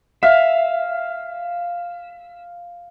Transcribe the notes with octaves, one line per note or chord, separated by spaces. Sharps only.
E5 F5